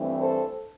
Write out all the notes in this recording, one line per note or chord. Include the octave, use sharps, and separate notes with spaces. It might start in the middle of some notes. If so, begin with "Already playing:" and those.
Already playing: G2 E3 A3 C4
A4 C5